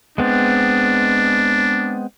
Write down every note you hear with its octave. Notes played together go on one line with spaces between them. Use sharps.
G#3 B3 C4 D4